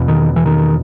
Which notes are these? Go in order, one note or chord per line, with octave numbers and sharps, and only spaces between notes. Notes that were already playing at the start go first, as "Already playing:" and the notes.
Already playing: E2 B2
D#3
E3
D#3